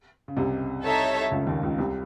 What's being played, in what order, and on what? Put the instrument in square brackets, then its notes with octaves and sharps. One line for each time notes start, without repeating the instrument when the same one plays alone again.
[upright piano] C#3
C2 C3
[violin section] D#4 A4 C#5 E5 A5
[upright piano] C#2 C#3
D#2 D#3
C#2 C#3
C2 C3